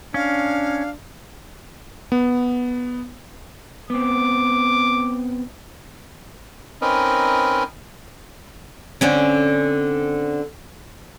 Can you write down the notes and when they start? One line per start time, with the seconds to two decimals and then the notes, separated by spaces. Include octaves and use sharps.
0.14 C#4 D4 F5
2.12 B3
3.90 B3 C4 D6
6.82 C4 C#4 D#4 A#4 B4 D#5
9.01 D3 C4 C#4